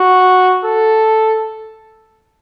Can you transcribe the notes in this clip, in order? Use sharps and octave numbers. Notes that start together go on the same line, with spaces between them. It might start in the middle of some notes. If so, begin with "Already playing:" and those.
Already playing: F#4
A4